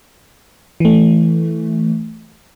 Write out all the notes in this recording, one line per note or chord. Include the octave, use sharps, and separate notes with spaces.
E3 A3